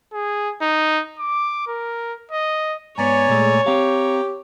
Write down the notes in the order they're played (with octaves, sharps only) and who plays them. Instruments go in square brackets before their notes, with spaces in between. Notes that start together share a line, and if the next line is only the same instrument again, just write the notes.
[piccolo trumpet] G#4
D#4
D6
A#4
D#5
[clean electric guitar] G#2 B3 [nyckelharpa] C#5 [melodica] D5 G#5 A#5
[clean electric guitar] A#2 A3 [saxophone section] G#3
[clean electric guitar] C4 F5 [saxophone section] G4 [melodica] A#5